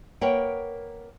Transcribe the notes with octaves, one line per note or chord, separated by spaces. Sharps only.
A#3 A#4 B4 C#5 F#5 G5